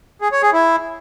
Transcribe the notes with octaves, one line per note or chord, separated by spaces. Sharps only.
G#4
C#5
G#4
E4